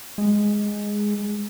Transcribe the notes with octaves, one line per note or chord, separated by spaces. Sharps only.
G#3